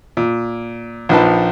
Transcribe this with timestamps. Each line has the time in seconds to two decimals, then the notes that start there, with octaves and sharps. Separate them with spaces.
0.17 A#2
1.09 A#1 F3 D#4 B4 A5